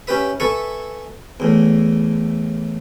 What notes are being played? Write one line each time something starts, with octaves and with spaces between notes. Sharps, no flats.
C#4 G4 B4 E5
A4 B4 E5 G#5 C#6
E2 A2